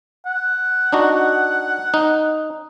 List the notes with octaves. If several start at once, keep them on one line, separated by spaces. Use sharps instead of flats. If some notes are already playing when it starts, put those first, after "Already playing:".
F#5
D4 D#4 F#4
D#4